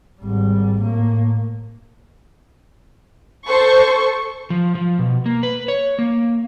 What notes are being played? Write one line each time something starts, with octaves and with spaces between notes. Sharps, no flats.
G#1 G3
A2 A#3
A4 C5 C#6
F3
F3
B2
A#3
B4
C#5
A#3